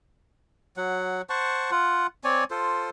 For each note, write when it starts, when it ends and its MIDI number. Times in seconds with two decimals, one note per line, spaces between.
0.77 1.22 54
0.77 1.22 78
1.30 1.71 72
1.30 1.71 78
1.30 1.71 81
1.30 1.71 85
1.71 2.07 65
1.71 2.07 78
2.24 2.44 60
2.24 2.44 73
2.24 2.44 74
2.24 2.44 80
2.51 2.90 65
2.51 2.90 69
2.51 2.90 72